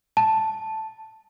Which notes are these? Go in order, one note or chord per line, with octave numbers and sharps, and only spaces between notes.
A5